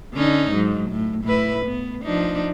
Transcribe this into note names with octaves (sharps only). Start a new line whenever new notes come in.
D3 C#4 D#4
G#2 F#3
A2
A2 E4 B4
B3
F3 D4 D#4